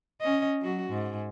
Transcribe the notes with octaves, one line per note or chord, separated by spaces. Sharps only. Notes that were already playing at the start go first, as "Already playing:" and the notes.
C#4 D#5
F#3 F#4
G#2